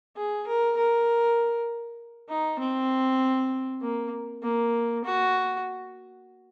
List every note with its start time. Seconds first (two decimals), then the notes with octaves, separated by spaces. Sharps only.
0.16 G#4
0.47 A#4
0.77 A#4
2.29 D#4
2.59 C4
3.82 A#3
4.43 A#3
5.04 F#4